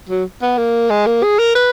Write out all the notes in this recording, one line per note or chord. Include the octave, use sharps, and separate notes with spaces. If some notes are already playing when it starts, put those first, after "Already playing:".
F#3
B3
A#3
G#3
A#3
G#4
A#4
B4